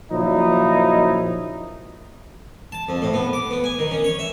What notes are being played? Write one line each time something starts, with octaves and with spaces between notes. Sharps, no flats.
A#2 C#3 F3 F#3 D#4 E4
A5
F2
A2
B3
D6
B3
G#5
D#3
C#4
C#5
E5